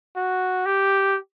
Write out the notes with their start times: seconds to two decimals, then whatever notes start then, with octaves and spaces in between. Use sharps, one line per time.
0.16 F#4
0.65 G4